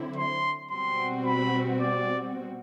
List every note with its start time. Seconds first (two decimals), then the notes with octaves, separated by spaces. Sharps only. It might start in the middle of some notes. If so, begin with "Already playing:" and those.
Already playing: D3 F#3 C4 E4
0.16 C6
0.70 B2 G3 C4 F#4 C6
1.26 B5
1.80 D5